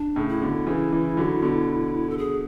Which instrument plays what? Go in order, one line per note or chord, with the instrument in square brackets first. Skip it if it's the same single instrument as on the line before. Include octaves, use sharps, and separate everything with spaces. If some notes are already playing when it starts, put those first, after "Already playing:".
Already playing: [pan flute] D4
[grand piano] A2 C#3
[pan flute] E4
[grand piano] B2 D3
C#3 E3
C#3 E3
D3 F#3
B2 D3
[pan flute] A4
G#4